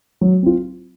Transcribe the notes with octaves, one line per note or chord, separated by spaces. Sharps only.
F#3
C4 F4